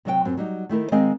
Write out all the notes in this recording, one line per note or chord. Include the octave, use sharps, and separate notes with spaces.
C3 F#3 C#5 G5
F#2 F#3 C4
F#3 G3 D#4
D#3 A3 E4 A#4
D#3 G#3 C4 D#5 F5 G#5